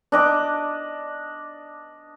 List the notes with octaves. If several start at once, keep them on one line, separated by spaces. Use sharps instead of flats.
D4 D#5 D6